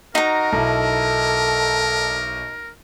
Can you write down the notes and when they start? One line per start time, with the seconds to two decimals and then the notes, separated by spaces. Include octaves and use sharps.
0.15 D#4 F#4 A#4 A#5
0.52 B1 E4 A4